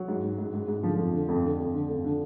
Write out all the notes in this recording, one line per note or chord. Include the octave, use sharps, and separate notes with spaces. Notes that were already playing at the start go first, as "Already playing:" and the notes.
Already playing: F#3
G#2
G#2
G#2
G#2
G#2
D3 F3
F2
D3
F2
D3
F2
D3
F2
D3